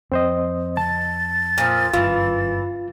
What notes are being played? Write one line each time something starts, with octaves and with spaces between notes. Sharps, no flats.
F2 C4 C5 D#5
A5 A6
A#2 F3
G1 F#2 E3 F4